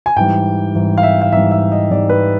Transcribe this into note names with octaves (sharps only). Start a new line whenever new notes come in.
G#5
G#2 E3 G3 G5
G#2 E3 G3
F5
E5
F5
G#2 E3 G3 E5
E5
D#5
G#2 E3 G3 D5
B4